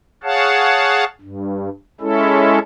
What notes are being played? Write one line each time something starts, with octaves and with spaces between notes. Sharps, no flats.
G#4 C#5 F5 F#5 A5
G2
G#3 C#4 E4 A4